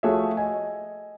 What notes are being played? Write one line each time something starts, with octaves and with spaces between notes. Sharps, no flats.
F3 A3 F#4 G#4 C#5 E5
D#5 G#5